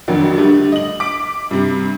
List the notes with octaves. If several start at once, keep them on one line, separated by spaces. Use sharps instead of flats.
A#1 F2 D3 D#3 F#3
D3 G3 A3
D#5 F#7
D6 B6 D7
G2 C3